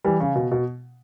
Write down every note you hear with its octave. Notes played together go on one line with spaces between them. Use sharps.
E3 G3
C#3
B2
B2